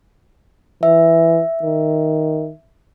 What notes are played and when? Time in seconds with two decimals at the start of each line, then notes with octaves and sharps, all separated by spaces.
0.83 E3 E5
1.63 D#3